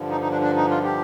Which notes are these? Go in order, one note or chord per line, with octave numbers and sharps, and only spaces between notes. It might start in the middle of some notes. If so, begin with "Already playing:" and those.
Already playing: G2 D3 F3
D#4
D#4
D4
D4
D#4
F4
G4